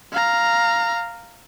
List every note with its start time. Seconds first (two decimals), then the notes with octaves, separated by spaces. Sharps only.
0.12 F5 A#5